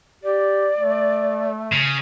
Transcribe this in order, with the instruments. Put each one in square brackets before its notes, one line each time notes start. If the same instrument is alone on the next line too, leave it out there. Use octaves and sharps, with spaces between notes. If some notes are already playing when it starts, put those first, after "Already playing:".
[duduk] G4 [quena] D5
[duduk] A3
[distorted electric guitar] C#3